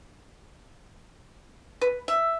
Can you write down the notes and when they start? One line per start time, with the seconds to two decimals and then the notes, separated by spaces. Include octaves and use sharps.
1.81 B4
2.08 E5